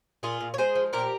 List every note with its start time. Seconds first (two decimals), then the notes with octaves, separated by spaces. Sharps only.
0.23 A#2 F4 G#4
0.41 A#2
0.54 C#5
0.58 G#3 G#4 C5
0.75 F3
0.93 A#2 G4 A#4